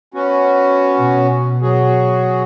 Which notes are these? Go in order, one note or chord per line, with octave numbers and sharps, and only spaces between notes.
B3 C#4 F#4
B2
F#3 F#4 G#4